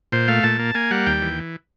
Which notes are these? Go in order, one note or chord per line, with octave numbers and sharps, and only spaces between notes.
A#2 C5
A3 F5
A#2 A5
A#3
A#3 G#5
G3 F#5
D#2 G5
E3